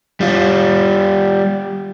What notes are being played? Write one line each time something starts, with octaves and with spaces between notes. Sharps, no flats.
G3 F4